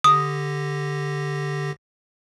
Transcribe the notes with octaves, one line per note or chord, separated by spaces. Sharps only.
D3 G4 D#6 A#6